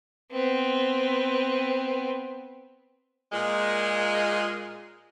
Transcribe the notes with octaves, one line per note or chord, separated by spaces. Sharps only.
B3 C4
A#2 G#3